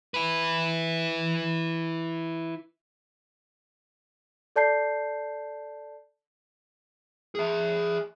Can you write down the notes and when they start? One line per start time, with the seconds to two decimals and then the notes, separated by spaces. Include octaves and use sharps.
0.14 E4 B4
4.56 A4 D5 A5 G6 C7
7.35 G#4 E5